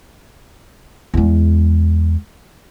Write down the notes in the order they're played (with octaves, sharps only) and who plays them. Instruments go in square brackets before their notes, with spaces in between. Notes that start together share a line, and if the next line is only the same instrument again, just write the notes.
[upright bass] E2 G#3